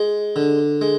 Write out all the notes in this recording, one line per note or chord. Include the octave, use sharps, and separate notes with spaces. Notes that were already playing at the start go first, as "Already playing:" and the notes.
Already playing: G#3
D3
G#3